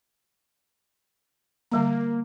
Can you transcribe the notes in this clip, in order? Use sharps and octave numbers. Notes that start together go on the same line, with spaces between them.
D3 G3 A#3 A#5